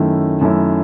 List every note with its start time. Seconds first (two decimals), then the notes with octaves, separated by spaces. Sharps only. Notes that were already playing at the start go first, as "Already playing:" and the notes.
Already playing: F#2 D#3 A3 C#4 E4
0.41 F#2 D#3 A3 C#4 E4